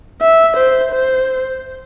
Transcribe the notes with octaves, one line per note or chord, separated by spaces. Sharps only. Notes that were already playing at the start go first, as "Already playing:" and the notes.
E5
C5
C5